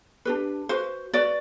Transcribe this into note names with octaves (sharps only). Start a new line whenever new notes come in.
D4 G4 B4
F#4 B4 C5
F#4 B4 D5